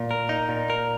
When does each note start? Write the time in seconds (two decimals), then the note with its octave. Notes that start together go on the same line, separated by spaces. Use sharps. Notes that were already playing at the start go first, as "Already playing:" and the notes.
Already playing: A#2
0.11 A#4
0.29 D#4
0.49 A#2
0.70 A#4